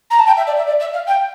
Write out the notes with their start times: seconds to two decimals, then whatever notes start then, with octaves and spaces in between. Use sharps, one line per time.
0.10 A#5
0.19 A5
0.27 G5
0.36 E5
0.47 D5
0.57 E5
0.67 D5
0.80 E5
0.93 F5
1.07 G5